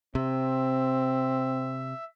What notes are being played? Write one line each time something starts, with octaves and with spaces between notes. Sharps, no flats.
C3 C4 E5